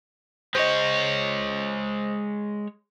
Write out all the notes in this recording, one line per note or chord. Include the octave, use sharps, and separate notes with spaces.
G#3 C5 C#5 D#5